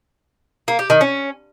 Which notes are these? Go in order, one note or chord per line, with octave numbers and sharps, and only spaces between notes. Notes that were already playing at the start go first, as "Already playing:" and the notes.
A#3
G4
D#3
C#4